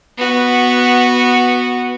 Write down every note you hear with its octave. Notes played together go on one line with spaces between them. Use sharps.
B3 F#4